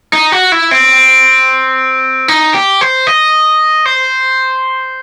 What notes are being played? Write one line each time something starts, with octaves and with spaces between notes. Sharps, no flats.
D#4
F#4
E4
C4
D#4
G4
C5
D#5
C5